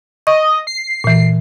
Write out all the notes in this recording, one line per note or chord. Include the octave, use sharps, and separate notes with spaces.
D#5 C#6
C7
A#2 E3